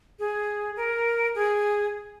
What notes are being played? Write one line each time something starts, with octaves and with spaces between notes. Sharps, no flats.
G#4
A#4
G#4